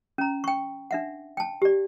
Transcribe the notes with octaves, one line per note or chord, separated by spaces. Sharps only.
C#4 A#5
G5 C#6
D4 E5 F#5
G5 A5
G4 D5